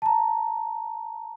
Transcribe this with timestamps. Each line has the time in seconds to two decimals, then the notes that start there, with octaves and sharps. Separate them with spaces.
0.02 A5 A#5